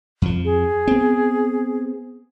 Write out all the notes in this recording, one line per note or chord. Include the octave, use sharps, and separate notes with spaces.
F2 F3
G#4
B3 C4